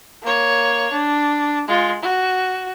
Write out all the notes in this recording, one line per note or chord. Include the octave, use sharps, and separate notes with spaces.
A#3 C#5
D4
G#3 F4
F#4